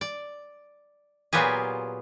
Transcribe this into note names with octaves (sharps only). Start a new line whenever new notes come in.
D5
A#2 F#3 B3 F4 G4 G#4